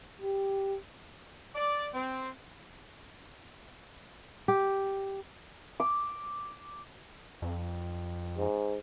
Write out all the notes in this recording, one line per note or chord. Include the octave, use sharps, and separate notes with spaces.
G4
D5
C4
G4
D6
F2
G#2